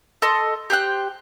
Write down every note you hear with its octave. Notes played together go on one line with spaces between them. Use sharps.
A4 D#5 C6
G4 C5 G5 F#6